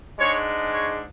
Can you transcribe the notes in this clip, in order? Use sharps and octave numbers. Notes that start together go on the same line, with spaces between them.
G#2 G#3 D4 C#5
C#5